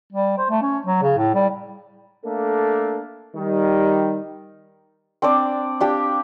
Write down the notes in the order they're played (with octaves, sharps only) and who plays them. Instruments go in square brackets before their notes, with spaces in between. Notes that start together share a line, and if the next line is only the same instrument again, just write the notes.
[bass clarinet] G3
C5
A3
C#4
F#3
C#3
A2
G3
[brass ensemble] A3 A#3 D4 A4
D#3 G3
[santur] C4 D4 C5 D5
D4 G4 F5 G5